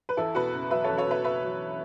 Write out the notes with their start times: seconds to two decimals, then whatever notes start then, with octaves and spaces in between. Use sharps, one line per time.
0.09 B4
0.17 E2 E4 A4
0.35 B2 F#4 B4
0.52 F#1
0.70 F#3 B4 E5
0.84 A4 C#5
0.89 E2
0.97 A4 C#5
1.06 B2 B4 E5
1.24 F#1 B4 E5
1.43 F#3